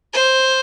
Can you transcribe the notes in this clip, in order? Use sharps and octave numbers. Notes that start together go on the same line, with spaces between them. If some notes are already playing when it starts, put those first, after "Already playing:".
C5